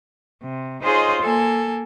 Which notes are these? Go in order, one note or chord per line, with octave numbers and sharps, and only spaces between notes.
C3
D#4 F4 G#4 C5 C#5 D#5
A#3 A4 G#5